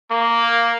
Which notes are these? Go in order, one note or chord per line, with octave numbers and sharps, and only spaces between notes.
A#3